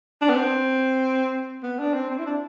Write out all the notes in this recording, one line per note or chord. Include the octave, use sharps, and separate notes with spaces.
D4
B3
C4
B3
D4
C4
C4
E4
D4